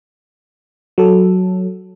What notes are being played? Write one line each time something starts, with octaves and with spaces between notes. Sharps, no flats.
F#3 A4